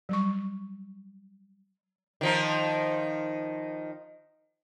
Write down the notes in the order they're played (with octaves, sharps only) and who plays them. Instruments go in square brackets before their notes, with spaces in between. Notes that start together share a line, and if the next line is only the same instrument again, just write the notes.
[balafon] F#3 G3 C#6
[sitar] D#3 F3 D#4